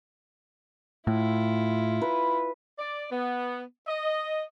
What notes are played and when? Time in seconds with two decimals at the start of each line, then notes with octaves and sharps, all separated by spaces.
1.07 A2 E4 F4
2.02 B4
2.79 D5
3.10 B3
3.88 D#5